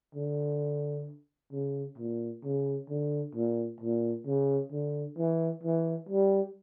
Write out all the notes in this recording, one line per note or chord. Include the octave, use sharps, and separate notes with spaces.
D3
C#3
A#2
C#3
D3
A#2
A#2
C#3
D3
E3
E3
G3